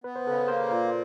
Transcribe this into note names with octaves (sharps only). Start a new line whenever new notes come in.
B3 B4
C5
C#3 A4 B4
B4
A#3 A#4 C5
A#2